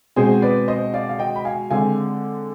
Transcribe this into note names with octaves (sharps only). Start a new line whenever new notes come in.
B2 G#3 C4 G#4 C5
B4 D5
C5 D#5
D5 F5
F5
D#5 G5
B5
F5 G#5
D3 G#3 C4 F5 G#5